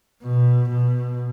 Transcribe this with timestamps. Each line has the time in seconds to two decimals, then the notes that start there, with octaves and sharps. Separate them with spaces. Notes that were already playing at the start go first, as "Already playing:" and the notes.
0.22 B2
0.69 B2